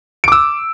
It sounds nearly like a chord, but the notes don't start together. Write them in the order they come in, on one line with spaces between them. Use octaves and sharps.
D7 D6 E6